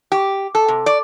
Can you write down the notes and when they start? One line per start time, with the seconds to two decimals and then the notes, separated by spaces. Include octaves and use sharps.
0.12 G4
0.55 A4
0.68 C3
0.86 D5